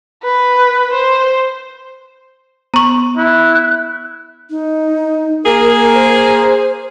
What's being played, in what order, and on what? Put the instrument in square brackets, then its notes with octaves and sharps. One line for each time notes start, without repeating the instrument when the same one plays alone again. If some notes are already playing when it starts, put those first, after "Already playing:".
[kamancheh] B4
C5
[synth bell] B3 [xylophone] A#5 C#6
[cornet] E4 [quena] F#6
[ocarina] D#4
[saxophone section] A#3 G#4 [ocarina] A#4
[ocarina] C5